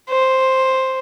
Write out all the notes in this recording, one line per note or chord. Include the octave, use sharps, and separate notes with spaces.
C5